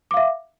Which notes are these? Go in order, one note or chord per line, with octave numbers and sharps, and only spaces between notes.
E5 F5 D6